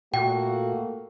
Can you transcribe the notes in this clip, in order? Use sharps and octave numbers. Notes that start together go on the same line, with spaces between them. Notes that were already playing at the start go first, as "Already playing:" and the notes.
A#2 A3 A#3 F#4 G5